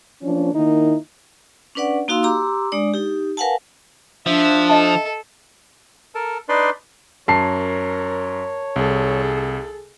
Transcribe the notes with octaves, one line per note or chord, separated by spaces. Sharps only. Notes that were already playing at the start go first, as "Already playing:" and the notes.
F3 A#3 C#4 D4
D#3 A#3 D#4 E4
C#4 D4 B4 D5 F#5
A#3 D#4 F#4 F5 C6 E6
G4 A#5 C6 D6 E6
G#3 D4 D5 D#6
D#4 G4
A#4 B4 F5 F#5 G#5 A5
F3 D4 E5
A4 D#5 E5 A5
A4 A#4 A5
D4 D#4 B4 D5 C6
F#2 A#4 C#5 A5 C7
C2 G#4 A4